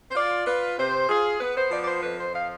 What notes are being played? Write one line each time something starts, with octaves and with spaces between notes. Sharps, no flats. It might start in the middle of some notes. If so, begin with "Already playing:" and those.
C5
F4 D5
F4 B4
C3 C5
F4 G#4
B3 B4
C5
F3 D5
D5
C5
F2 B4
C5
F3 F5